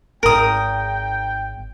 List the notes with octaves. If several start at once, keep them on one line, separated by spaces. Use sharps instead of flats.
G#1 G#2 A#4 G5 D#6